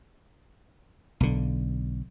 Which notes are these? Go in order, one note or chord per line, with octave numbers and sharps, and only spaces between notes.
B1 D3